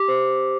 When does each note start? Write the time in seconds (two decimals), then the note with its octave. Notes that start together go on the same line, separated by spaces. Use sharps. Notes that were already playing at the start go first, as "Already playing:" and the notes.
Already playing: G4 D6
0.08 C5